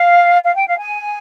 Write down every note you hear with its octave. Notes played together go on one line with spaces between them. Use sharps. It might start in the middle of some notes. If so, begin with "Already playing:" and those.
Already playing: F5
F5
G5
F5
G#5